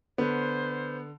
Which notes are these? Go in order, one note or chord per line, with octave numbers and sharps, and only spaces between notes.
D3 B3 C5